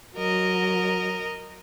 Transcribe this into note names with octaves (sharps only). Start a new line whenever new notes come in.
F#3 A#4 D#5